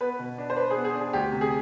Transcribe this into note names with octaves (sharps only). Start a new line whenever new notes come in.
B3 B4
B2
D4
C5
D4 B4
G#4
B3
G#4
D4 G#4
D2 G4
C3
G#4